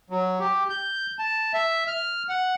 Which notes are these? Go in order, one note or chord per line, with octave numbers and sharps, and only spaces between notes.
F#3
G4
G6
A5
E5
F6
F#5